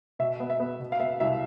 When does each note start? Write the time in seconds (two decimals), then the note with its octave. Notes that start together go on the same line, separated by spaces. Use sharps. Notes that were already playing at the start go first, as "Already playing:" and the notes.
0.19 B2 E5
0.40 B3
0.50 E5
0.60 B3
0.80 B2
0.92 F5
1.00 B3 E5
1.20 C2 E5